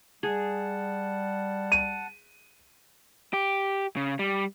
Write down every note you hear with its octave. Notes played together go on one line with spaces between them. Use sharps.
G3 G#4 F#5 A5
D#7
G4
C#3
G3